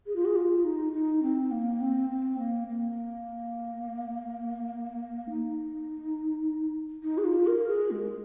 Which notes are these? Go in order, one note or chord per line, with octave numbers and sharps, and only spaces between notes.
G#4
F4
G#4
F4
D#4
D#4
C4
A#3
C4
C4
A#3
A#3
D#4
D#4
G#4
F4
A#4
G#4
G#3